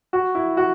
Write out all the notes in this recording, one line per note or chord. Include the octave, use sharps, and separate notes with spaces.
F#4
E4
F#4